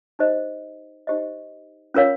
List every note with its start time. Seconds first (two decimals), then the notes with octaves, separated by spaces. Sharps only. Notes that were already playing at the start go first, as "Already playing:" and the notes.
0.19 D#4 G4 C5 D#5
1.07 D#4 G4 C5 D#5
1.94 C#4 F4 A#4 C#5 F5